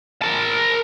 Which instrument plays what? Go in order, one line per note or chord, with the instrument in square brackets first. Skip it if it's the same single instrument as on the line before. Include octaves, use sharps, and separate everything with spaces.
[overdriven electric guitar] A#4 A5